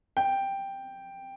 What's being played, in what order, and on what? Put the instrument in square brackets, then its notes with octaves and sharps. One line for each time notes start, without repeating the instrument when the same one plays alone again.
[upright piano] G5